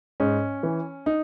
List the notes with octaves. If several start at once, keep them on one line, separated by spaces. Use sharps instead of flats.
G#2 C#4
E3
D#4